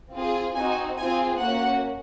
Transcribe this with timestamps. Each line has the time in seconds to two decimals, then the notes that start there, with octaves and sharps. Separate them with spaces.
0.13 C4 F4 G#4
0.55 C4 D#4 F#4 G#5
0.96 C4 F4 G#4 G#5
1.39 A#3 C#4 F#4 F#5